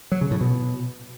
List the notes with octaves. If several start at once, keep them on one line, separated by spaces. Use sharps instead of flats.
F#3
C#3
A2
B2